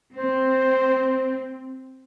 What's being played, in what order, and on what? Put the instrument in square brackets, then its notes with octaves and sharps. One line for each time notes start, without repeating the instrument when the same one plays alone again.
[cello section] C4 [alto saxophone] C5